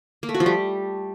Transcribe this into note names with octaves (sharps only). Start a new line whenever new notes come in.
A#3
A3
F#4
F3
G3